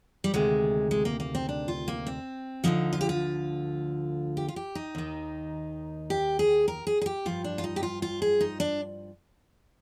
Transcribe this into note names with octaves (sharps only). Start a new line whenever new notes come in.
G3
D2 C3 D#3 G#3
G#3
A#3
A#3
C4
D4
F4
A#3
C4
D2 D3 F3 D#4
F4
G4
F4
G4
F4
G4
D#4
D#2 D#3
G4
G#4
A#4
G#4
G#4
G4
G2 F3 F4
D4
F4
D#4
G4
F4
F4
G#4
D#4
D4